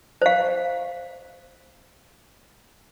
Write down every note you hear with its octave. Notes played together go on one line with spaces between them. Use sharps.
C5 F5